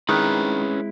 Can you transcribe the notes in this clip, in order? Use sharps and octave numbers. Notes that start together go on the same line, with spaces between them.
D#3 G#3 C4 C#4 E4 G#4 B4 F#6